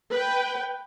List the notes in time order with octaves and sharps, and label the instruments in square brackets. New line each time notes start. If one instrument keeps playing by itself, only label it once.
[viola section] B4 G5